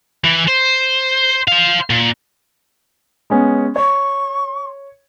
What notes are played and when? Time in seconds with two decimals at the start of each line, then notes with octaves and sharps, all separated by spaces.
0.24 E3
0.48 C5
1.48 C5 F5
1.90 A#2
3.30 G#3 B3 C#4
3.76 C#5 C#6